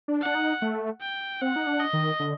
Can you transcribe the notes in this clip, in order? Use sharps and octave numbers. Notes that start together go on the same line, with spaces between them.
D4
D4 F#5
D#4
A3
G5
C4 F#5
D#4
D4
D#5
D#3
D3